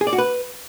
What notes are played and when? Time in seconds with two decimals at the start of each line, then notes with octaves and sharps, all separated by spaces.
0.01 G#4
0.07 D5
0.13 F#4
0.18 B4